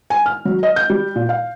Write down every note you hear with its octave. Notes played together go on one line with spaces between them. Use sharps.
G#5
F6
F#3
D#5
G6
G3
A#2
F5